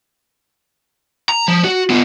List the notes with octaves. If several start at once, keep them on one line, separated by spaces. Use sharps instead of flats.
A#5
F3
F#4
B3 F4